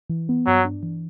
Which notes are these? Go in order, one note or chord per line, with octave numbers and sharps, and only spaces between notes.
E3
B3
G2 F#3
D4
E3